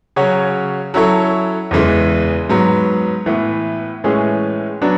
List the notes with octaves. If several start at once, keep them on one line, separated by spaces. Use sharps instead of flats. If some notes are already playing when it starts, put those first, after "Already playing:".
C#3 F#3 C#4 F#4 C#5
F#3 C#4 E4 A4 C#5
E2 C#3 E3 G#3
G#2 F#3 B3
A2 E3 B3
A2 E3 G#3 C#4 G#4
F#3 B3 D4